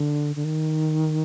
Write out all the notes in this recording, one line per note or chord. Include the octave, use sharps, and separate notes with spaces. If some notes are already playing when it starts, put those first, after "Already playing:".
Already playing: D3
D3
D#3